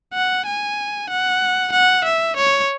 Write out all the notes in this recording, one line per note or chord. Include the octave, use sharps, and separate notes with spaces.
F#5
G#5
F#5
F#5
E5
C#5